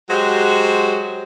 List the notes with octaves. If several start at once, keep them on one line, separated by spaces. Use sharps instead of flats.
F#3 G#3 F#4 G4 C5